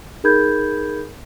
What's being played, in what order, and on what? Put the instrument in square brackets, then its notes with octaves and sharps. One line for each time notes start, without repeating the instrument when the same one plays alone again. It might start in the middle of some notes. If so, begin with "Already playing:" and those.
[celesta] D#4 G#4 A#4 B5 G6 G#6